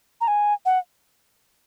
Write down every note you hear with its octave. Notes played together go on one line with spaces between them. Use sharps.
A#5
G#5
F#5